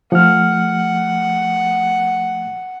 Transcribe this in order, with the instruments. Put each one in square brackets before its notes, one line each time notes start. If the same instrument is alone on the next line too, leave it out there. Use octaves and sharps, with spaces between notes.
[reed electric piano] F3 A3 F6 [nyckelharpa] F#5